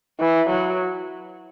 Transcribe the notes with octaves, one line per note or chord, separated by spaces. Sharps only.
E3
F#3